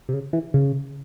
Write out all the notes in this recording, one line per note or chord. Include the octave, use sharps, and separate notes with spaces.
C3
C#3
E3
C#3